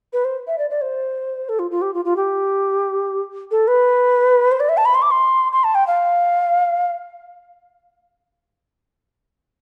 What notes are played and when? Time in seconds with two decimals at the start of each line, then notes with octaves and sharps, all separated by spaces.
0.13 B4
0.25 C5
0.47 E5
0.58 D5
0.70 D5
0.82 C5
1.49 A4
1.59 F4
1.71 F4
1.82 G4
1.94 F4
2.05 F4
2.16 G4
3.51 A4
3.68 B4
4.52 C5
4.60 D5
4.69 E5
4.77 A5
4.85 B5
4.95 C6
5.02 D6
5.11 C6
5.52 C6
5.64 A5
5.75 G5
5.87 F5